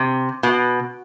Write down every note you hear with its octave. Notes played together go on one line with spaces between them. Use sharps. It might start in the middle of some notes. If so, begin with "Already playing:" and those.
Already playing: C3
B2